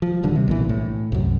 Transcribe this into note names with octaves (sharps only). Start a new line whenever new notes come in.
F3
D#1 D#2 D3 G3
C3
B1 A#2 E3
A2
C2 F#2